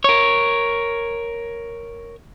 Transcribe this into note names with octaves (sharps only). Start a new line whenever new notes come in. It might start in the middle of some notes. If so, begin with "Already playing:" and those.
A#4 C#5